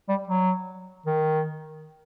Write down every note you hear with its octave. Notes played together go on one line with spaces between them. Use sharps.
G3
F#3
D#3